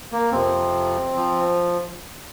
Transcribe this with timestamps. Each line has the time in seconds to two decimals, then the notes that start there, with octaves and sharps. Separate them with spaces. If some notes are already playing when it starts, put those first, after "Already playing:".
0.12 A#3
0.32 F2 C3 F3 C4
1.16 F3